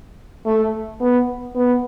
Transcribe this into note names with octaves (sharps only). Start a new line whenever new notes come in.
A3
B3
B3